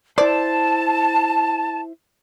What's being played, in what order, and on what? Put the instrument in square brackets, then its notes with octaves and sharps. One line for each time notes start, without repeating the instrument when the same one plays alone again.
[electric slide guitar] E4 C5 [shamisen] D5 [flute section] A5